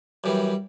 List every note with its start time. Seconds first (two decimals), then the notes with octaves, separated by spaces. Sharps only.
0.24 F#2 E3 G3